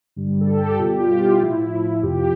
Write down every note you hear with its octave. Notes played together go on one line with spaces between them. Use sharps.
G2 D3 G3
A4
G4
G4
B2 G3 F4
G4
F4
E4
A2 F3 E4
F2 C3 F3 G4